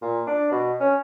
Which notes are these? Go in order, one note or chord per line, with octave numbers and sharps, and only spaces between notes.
A#2
D4
B2
C#4